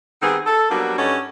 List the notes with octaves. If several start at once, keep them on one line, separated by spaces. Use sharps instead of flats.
D#3 G3 B3 C4 G#4
A4
F#3 G3 A#3 B3 D4 F#4
G2 C#4 D#4 F#4 G4 A4